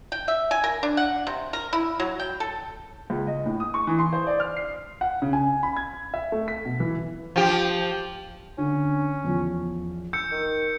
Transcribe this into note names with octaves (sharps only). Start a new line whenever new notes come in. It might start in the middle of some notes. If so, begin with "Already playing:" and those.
G5
E5
G#5
A#4
D4
F#5
C3
A#4
E4
F#3
G5
A4
C#2
D#5
A2
D#6
C#6
E3
C6
C5
D5
F6
C7
F#5
C#3
G#5
B5
G#6
E5
A3
B6
B2
E3
F3 G4
D3 C#4
E2 F3
E6 G6 C#7
D#3